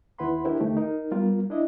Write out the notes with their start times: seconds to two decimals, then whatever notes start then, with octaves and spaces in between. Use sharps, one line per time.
0.19 D#2 E4 B4 F#5 B5 C6
0.45 D4 E4 G4 A#4 C5
0.60 D#2 D3 A3 D#4 G4
0.77 D#4 A#4
1.11 G3 B3 F4 A#4
1.50 D4 E4 D#5